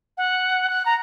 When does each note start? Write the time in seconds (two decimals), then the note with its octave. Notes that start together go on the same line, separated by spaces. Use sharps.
0.18 F#5
0.70 F#6
0.86 A#5